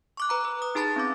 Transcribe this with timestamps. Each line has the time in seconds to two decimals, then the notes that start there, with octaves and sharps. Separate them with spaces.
0.17 C#6 D6 F#6
0.29 B4 A#5 B5
0.45 B4
0.62 D#6
0.75 D#4 G#4 A5 B5 A6
0.96 C4 C#4 D6